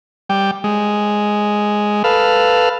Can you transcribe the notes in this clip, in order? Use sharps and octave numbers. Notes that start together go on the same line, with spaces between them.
G3 G5
G#3
A4 B4 F5